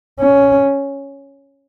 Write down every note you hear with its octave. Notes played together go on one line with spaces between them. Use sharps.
C#4